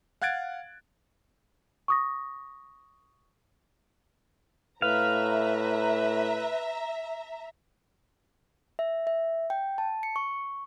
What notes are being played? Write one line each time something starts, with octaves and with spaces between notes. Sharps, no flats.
F5 F#5 F#6 G#6 A6 D7
C#6 D#6 A#6
A2 B4 E5 F5 A#5
E5
E5
G5
A5
C#7
C#6